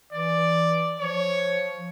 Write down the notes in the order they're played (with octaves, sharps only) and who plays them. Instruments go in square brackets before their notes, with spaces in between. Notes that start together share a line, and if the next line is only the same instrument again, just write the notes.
[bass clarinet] E3 [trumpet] D5
[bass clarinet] F3 [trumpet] C#5